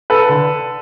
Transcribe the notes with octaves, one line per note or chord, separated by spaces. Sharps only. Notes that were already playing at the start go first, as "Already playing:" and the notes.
A4 B4
D3